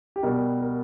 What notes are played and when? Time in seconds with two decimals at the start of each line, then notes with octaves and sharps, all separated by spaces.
0.16 G4
0.23 B2 G3 A#4
0.61 A#4